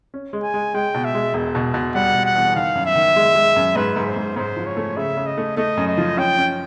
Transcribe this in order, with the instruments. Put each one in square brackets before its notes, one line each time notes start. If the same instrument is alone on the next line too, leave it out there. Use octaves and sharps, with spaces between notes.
[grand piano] C#4
G#3
[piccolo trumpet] G#5
[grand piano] G#3
[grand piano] G#3 [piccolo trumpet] G5
[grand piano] B2
[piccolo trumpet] E5
[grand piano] G#3
E1
B2
B2
[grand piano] G3 [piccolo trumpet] F#5
[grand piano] E1
[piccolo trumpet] F#5
[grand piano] E2
[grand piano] D#3 [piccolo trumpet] F5
[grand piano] F#2
[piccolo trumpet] E5
[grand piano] D#3
G#3
G#3
F#2
[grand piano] G#2 [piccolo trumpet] B4
[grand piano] G#2
[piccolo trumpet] C5
[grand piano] G#2
[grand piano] G#2 [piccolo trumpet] C5
[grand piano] F3
[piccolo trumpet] C#5
[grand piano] A3
[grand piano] C#3 [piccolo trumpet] E5
[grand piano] C#3
[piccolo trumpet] D#5
[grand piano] A3
[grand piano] A3 [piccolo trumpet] D#5
[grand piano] F#2
[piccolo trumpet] D#5
[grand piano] F3
[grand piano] C#4 [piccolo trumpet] G5
[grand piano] C#4